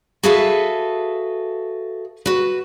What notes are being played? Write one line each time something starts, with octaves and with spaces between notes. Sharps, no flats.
F#4 G#4 A4 B4 E5 F5
F#4 B4